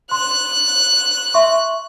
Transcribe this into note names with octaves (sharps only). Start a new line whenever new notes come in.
C6 F#6
E5 C6 C#6